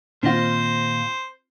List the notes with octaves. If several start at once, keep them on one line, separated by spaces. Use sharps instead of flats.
A#2 D#3 C4 F4 C5 D#5